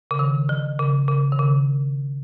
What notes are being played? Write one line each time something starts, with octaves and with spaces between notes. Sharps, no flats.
C#3
D#3
F3
C#3
C#3
D#3
C#3